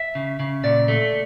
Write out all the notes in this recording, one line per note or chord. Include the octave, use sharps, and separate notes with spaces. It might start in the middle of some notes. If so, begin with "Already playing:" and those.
Already playing: E5
C#3
C#3
A#2 D5
A3